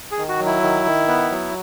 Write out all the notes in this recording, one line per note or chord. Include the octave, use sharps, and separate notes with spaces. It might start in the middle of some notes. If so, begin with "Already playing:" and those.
G#4
D#3
F#4
F#3
E4
D#3
D#3
B3
F#3